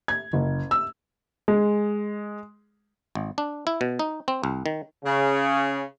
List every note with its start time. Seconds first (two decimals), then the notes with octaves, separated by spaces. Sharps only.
0.08 G#6
0.33 F#1
0.71 E6
1.48 G#3
3.15 G#1
3.38 D4
3.67 E4
3.81 B2
3.99 D#4
4.28 C4
4.44 C2
4.66 D#3
5.04 C#3